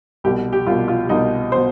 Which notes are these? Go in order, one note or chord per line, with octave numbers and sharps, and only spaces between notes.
C2 B2 G4
G4
C2 B2 F4
F4
C2 B2 D#4
C5
B2